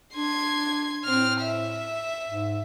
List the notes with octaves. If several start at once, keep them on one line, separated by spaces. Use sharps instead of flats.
D4 C6 G#6
A2 C4 F6
E5
G#2